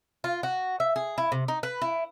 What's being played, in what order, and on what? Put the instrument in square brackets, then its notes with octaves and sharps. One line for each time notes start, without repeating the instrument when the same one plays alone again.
[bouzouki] F4
F#4
E5
G#4
E4
C3
D#4
B4
E4